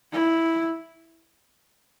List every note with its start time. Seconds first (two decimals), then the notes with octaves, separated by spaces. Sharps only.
0.12 E4